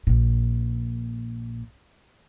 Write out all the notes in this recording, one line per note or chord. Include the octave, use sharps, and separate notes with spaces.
A#1 A#2